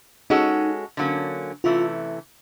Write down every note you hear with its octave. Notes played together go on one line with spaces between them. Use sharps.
G#3 C#4 D#4 F#4 A4
D3 F#3 A#3 C#4
C3 E3 A3 C#4 F4